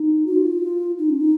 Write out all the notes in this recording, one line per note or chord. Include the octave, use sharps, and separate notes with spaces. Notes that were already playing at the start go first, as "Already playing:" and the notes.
Already playing: D#4
F#4
F4
D#4
C#4
D#4